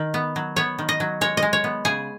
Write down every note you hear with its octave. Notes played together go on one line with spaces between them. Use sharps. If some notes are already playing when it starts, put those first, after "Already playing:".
Already playing: D#3
B3
F#3
B3 C#5
D#3
D#5
F#3
G#3 C#5
D#5
G#3
C#5
B3
C#3 G#4